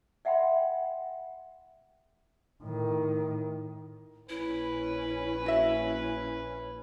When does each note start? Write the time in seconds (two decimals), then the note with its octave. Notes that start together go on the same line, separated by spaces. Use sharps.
0.25 D5 E5 F#5 G5 B5 C6
2.64 A2 D#3
4.29 A#1 C#4 E4 B4
5.46 F#4 E5